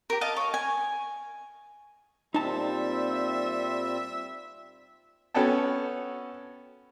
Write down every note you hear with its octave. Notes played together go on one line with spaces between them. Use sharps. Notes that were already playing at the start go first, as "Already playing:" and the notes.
G4 A#4
D#5 F5 A5
C#5
G#5
A#2 G3 C4 D#4 E5 A5
B3 C#4 F#4 A4 G5 A5